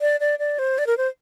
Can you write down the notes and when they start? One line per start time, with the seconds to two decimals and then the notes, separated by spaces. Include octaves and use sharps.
0.01 D5
0.20 D5
0.39 D5
0.59 C5
0.78 D5
0.87 A#4
0.97 C5